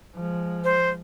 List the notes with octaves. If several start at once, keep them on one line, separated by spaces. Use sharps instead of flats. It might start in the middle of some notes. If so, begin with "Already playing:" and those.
F3 G#3
C5